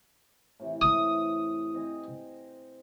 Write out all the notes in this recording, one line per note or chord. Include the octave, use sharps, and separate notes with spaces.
A2 C3 E3
D#6
C4 D#5 G#5